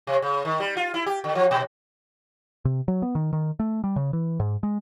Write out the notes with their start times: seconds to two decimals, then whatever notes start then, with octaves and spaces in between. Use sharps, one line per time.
0.07 C3
0.22 C#3
0.45 D#3
0.60 G3
0.77 F4
0.94 E4
1.06 G4
1.24 D3
1.35 F3
1.51 A#2
2.65 C3
2.88 F#3
3.02 B3
3.15 D#3
3.33 D#3
3.60 A3
3.84 G3
3.96 C#3
4.13 E3
4.40 G#2
4.63 G#3